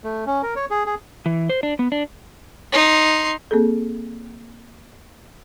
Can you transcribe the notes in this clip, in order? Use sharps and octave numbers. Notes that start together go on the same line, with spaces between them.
A3
C#4
A#4
C#5
G#4
G#4
E3
C5
D4
B3
D4
D#4 C6
A#3 C4 G#4 A4